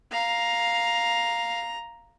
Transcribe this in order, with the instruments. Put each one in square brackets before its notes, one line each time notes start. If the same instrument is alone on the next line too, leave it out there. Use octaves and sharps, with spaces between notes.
[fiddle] F5 [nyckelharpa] A#5